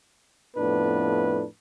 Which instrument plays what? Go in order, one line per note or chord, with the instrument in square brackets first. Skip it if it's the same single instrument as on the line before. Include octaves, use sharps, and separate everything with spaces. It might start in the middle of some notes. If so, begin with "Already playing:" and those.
[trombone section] F2 A2 B3 D4 B4